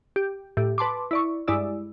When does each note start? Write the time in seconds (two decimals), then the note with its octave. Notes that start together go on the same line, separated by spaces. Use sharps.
0.16 G4
0.57 A2 G4
0.78 B4 A5 C6 D6
1.11 E4 D5 C#6
1.48 G2 G#3 E4 D5 E6